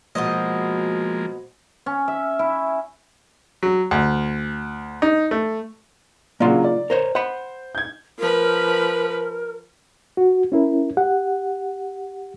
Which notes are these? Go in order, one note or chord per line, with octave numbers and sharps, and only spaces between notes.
B2 F3 G#3 A#3 C5 D#5
C#4
E5
E4
F#3
D2
D#4
A3
C#3 F#3 A#3 D4 F4
D5
A#4 C5 C#5
C5 F#5 B5
G6 G#6
F3 A#4 B4
F#4
C#4 E4 A#4
G4 F#5